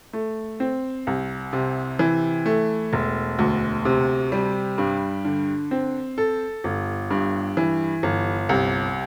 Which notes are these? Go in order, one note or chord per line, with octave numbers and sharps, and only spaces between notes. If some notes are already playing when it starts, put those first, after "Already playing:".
A3
C4
C2
C3
E3
A3
E1
D2
C3
G3
G2
D3
C4
A4
G1
G2
E3
G1
C2